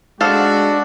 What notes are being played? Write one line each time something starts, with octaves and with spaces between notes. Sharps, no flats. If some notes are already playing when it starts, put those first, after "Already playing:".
G#3 D4 F#4 A4 C5 F5